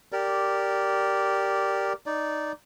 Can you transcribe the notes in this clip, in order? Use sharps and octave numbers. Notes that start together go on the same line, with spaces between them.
G4 A#4 D5
D#4 D5